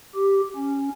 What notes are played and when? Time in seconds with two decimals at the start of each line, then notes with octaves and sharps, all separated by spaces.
0.15 G4
0.56 C#4